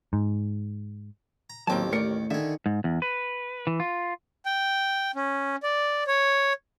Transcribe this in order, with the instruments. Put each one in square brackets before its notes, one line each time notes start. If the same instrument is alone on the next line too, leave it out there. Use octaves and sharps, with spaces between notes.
[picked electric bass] G#2
[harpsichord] A#5
[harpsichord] A1 D#2 G4 [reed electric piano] F#3 [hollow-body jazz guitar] A#3 C4 A5
[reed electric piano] A3 [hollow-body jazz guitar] A#4 D5 [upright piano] C#7
[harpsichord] D3 G#4 [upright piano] D#3 [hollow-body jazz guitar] E5
[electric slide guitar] G#2
E2
B4
E3
F4
[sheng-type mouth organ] G5
C#4
D5
C#5